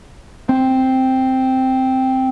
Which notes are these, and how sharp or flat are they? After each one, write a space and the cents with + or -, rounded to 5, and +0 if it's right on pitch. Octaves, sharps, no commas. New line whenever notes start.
C4 +0